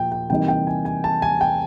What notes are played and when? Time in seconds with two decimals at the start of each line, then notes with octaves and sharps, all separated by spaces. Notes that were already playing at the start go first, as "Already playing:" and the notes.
Already playing: A#2 F3 G5
0.12 G5
0.30 C3 E3 G3 A#3 D#4 G5
0.48 G5
0.67 G#5
0.85 G#5
1.04 A5
1.22 G#5
1.41 G5